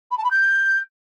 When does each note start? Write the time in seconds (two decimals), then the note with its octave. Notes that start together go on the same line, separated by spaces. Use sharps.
0.11 B5
0.18 A5
0.24 B5
0.31 G6